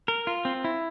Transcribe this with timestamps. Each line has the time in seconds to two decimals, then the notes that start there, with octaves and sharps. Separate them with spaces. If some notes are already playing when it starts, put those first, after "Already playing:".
0.08 A#4
0.27 F4
0.45 C4
0.64 E4